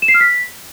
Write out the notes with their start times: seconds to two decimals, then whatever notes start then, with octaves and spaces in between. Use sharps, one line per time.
0.02 E7
0.08 C7
0.14 F6
0.20 B6